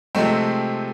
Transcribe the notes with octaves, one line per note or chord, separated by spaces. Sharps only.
C3 F3 G#3 A3 C4